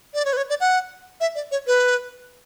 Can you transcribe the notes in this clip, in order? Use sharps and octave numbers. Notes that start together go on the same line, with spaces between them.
D5
C#5
B4
C#5
D5
F#5
E5
D5
C#5
B4